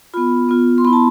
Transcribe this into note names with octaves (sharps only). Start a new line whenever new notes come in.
B3 F4 B5
B3 F4
C6
B3 E4 B5
A5